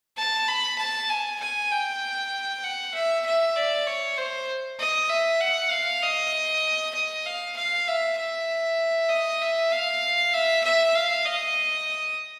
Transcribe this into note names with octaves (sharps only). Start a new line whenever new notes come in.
A5
B5
A5
G#5
G#5
G5
F#5
E5
E5
D5
C#5
C5
D#5
E5
F#5
F5
D#5
D#5
F5
F5
E5
E5
D#5
E5
F5
E5
E5
F5
D#5